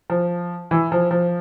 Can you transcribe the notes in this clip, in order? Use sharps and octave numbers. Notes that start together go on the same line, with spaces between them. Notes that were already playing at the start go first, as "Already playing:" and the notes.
F3
E3
F3
F3